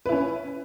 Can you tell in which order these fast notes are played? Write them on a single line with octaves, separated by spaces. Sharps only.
B4 E4 C#4